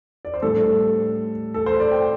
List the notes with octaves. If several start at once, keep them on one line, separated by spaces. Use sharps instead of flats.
D5
C5
A2 G3 D4 A4
A4
C5
D5
G5